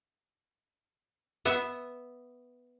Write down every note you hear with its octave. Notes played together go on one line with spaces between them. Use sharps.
B3 E5